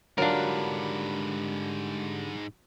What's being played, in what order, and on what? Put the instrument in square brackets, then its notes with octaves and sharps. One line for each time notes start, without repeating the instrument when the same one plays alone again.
[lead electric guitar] G#2 B4 [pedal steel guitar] D3 G3 [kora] F#3 F4 [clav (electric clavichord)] D4 A#4